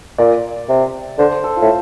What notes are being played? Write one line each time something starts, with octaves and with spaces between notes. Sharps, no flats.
A#2 D5
C3
D3 C5
A4
F4
A2